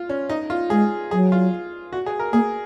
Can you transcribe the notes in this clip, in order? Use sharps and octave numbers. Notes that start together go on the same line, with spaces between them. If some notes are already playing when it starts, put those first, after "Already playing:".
Already playing: F4
C#4
D#4
F4
G#3 G#4
F#3 G#4
F4
F#4
G#4
A#4
A#3 G#4